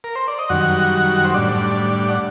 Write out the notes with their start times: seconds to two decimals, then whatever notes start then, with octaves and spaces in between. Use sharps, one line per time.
0.04 A#4
0.16 C5
0.28 D5
0.39 D#5
0.50 F#2 D#3 G3 F#4 F#5
1.25 C5
1.34 A2 G3 D4 D5
2.08 F#5